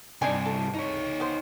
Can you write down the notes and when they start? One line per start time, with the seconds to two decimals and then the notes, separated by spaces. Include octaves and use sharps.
0.22 G2 C3 D4 D#4 G#5
0.46 A4
0.75 D#4 C#5
1.20 B3 C5